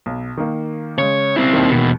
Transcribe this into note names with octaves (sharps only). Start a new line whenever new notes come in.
B1
D#3 A#3
C#3 G#3 C#5
C4 E4
D#2 D#3
E2 B2